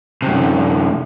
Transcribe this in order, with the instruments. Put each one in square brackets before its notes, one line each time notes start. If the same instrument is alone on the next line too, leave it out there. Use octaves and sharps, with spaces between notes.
[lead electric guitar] F#2 C3